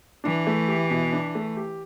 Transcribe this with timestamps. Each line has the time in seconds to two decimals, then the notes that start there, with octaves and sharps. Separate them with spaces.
0.24 E3 D4
0.47 A3
0.68 G4
0.90 B2
1.13 D4
1.35 A3
1.57 G4